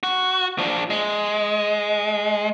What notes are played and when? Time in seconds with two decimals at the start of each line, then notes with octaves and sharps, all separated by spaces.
0.03 F#4
0.58 F3 D4
0.90 G#3